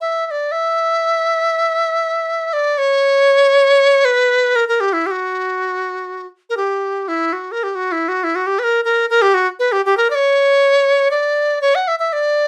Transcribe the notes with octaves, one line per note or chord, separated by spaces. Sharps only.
E5
E5
D5
E5
D5
C#5
B4
A#4
A#4
G4
E4
G4
F#4
A#4
G4
E4
F#4
A#4
G4
F#4
E4
F#4
E4
F#4
G4
B4
A#4
A#4
A#4
G4
F#4
B4
G4
G4
A#4
D5
C#5
D5
C#5
F#5
E5
E5
D5